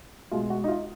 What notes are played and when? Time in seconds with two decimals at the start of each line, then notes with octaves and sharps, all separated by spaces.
0.31 B2 G#3 F4
0.50 F#4
0.64 D#4
0.68 F4